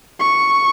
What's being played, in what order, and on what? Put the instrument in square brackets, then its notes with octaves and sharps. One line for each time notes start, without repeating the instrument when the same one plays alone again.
[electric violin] C#6